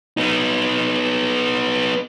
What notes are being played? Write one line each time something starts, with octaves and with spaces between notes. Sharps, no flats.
B3 D#4